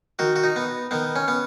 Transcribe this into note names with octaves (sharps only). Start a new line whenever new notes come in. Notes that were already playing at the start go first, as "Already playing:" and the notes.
D#3 F#4
F#4
D#4
B3
D#3 B3
C#4
B3